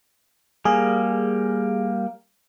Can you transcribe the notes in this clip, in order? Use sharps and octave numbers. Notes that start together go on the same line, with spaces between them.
G3 A#3 G#4